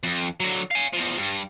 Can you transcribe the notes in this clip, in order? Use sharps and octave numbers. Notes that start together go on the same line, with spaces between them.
F2
D3 F#3
F5 G#5
E2 F3
G2